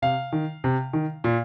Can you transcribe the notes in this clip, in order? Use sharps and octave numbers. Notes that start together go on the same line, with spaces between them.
C3 F5
D#3
C3
D#3
A#2